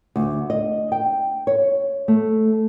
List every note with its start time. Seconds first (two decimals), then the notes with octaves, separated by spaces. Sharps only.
0.16 D2
0.50 D#5
0.92 G5
1.47 C#5
2.08 A3